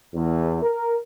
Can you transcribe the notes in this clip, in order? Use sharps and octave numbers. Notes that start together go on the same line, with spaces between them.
E2
A#4